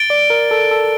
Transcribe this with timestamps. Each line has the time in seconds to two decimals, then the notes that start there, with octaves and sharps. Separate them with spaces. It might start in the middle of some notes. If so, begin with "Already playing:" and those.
Already playing: A6 D7 G7
0.10 D5
0.30 A#4
0.51 A4
0.71 A4